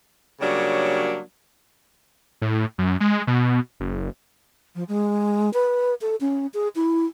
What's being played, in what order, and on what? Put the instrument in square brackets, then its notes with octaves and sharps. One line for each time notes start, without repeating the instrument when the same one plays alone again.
[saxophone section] C#3 F#3 G3 A#3 D4
[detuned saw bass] A2
F#2
G#3
B2
F#1
[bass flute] F3
G#3
B4
A4
C#4
G#4
E4